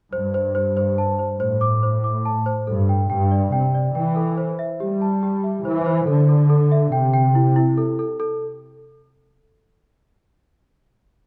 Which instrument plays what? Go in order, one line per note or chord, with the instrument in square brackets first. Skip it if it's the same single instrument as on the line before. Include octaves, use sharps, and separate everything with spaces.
[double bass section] G2 [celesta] C5
[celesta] C5
C5
C5
A5
C5
[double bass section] A2 [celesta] C5
[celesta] D6
C5
D6
A5
C5
[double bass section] G2 [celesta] A4
[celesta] G5
[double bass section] G2 [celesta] G5
[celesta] D5
[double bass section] C3 [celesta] G5
[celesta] D5
[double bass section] E3 [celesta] G5
[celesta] A4
C5
E5
[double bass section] G3 [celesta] G4
[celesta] A5
G4
E5
[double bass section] E3 [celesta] C5
[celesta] C5
[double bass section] D3 [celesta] A4
[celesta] A4
A4
E5
[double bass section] C3 [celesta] G5
[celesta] G5
E4
E4
A4
A4
A4